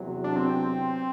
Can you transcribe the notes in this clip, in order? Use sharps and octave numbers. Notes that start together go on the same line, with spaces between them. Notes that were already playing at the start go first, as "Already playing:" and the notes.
Already playing: E2 C3 F#3
D4
C4